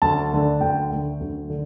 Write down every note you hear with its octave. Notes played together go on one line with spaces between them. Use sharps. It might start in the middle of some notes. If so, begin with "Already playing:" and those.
D2 A5
D3 A3
D2 G5
D3 A3
D2
D3